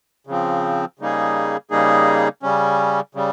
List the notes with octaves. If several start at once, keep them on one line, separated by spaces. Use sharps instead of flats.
C#3 F3 C4
C#3 G3 A#3 D#4 G#4
C#3 G3 A#3 D#4 G#4
C#3 G3 C#4
C#3 G3